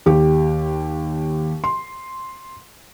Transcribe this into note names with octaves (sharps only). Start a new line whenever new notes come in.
D#2 G4
C6